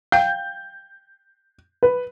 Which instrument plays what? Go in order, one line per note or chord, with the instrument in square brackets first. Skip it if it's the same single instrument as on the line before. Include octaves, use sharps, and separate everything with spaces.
[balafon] F5 G5 [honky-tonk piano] G6
[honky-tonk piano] B4